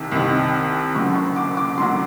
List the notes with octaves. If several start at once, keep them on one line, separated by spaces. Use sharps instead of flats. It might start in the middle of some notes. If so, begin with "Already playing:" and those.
Already playing: C2 C3 D#3
C2 C3 D#3
F#1 F#2 D3 F#3 C#6
C#6
D6
D6
F#1 F#2 D3 F#3 C6